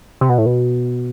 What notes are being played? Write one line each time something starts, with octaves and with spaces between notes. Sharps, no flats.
C3
B2
A2
B2